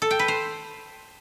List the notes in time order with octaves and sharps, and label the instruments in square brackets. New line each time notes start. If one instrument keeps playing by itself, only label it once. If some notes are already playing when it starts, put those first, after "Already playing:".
[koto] A4
G5
B4
C5